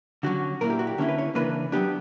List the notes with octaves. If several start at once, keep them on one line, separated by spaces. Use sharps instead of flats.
D3 F#3 C#4 F#4
A#2 A#3 E4 A#4
G4
F#4
G4
D3 A#3 C#4 E4 C#5
B4
C#5
C#3 E3 A#3 D4 B4
F#3 B3 D4 G4